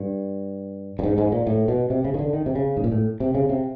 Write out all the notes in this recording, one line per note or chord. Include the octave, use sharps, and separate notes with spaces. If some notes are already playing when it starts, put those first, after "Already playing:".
Already playing: G2
G2
G#2
G#2
A#2
A2
B2
C3
C#3
D#3
D3
D#3
C3
C#3
G#2
A#2
A2
C3
C#3
C3